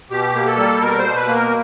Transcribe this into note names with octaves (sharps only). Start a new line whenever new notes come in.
B2 G4
A#3
A4
G3
B2 A#4
C5
B2
B4
A#3
A#4